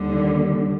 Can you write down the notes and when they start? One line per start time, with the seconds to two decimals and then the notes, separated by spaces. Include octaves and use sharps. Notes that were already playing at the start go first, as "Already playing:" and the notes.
Already playing: D#2 D3 G3